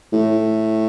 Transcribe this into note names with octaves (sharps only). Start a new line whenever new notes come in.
A2